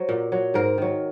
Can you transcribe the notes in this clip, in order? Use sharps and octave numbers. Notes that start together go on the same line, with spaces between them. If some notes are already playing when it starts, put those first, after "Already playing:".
Already playing: F#3 C5
A#2
F#3
G#2 A#4
D#3 F#3